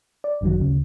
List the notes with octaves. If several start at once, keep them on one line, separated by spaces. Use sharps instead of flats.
D5
G#1 F#2 D3 D#3 F#3
D2 C#3